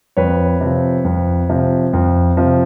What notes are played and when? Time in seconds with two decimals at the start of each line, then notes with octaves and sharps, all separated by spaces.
0.17 F2 B4 C#5
0.61 C3 F3
1.05 F2
1.50 C3 F3
1.93 F2
2.37 C3 F3